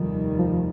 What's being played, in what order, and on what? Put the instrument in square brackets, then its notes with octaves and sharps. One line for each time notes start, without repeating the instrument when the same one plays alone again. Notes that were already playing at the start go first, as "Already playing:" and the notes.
Already playing: [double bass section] F1 D#2 D#3 G3 [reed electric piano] F3
[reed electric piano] F3